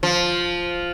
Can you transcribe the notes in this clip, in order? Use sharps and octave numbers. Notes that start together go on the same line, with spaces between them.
F3